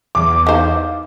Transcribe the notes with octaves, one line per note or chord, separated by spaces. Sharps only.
E2 D6
D#3 C5 F5